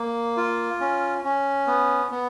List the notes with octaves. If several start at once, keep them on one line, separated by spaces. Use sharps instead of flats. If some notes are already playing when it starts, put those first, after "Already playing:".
Already playing: A#3
F4
C#4
C#4
B3
B3